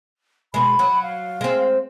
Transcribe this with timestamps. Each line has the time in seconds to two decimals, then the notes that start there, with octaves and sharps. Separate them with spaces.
0.54 B2 G#3 B5
0.79 F#3
1.02 F5
1.41 G#3 C4